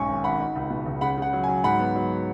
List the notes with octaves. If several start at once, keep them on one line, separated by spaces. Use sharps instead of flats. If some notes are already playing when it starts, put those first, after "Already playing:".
Already playing: B1 G#2 C#4 G#5 C#6
G#1
G#1 F#5 B5
D#4
C#2
B2
C#2
C#3 F#5 B5
C#3 F#5
F#3
G#5
F#3
G#2 F#5 B5
B3
F#3